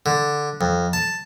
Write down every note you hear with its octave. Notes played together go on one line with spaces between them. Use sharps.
D3
F2
A5